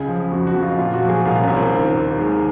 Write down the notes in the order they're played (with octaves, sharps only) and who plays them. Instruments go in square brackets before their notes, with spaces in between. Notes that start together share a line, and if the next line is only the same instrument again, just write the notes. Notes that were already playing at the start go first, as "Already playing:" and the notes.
Already playing: [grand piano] C#2 C#3 G#4
F3
F2 F#4
F#4
F2
F4
A#2 F4
F#4
F3
G#4
C2 F4
C#4
C2
C4
D#3
D#2
D#3 G#3